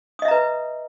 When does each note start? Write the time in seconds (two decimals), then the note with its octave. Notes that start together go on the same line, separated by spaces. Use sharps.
0.19 D#6
0.22 D#5
0.25 E5
0.28 A#5
0.31 B4